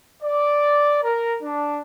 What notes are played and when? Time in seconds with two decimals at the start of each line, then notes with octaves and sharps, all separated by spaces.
0.23 D5
1.03 A#4
1.43 D4